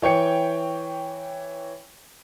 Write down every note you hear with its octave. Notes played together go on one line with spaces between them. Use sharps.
E3 C#5 G5 C#7